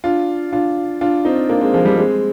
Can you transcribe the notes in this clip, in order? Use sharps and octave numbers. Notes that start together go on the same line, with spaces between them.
D4 F4
D4 F4
D4 F4
C4 D#4
A#3 D4
G#3 C4
F3 G#3
G3 A#3
G#3 C4